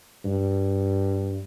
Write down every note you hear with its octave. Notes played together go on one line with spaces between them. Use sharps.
G2